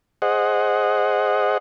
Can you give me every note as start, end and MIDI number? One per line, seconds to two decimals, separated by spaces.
0.22 1.58 68
0.22 1.58 72
0.22 1.58 75
0.22 1.58 78